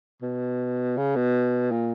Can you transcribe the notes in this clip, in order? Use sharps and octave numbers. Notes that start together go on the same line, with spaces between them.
B2
C#3
B2
A#2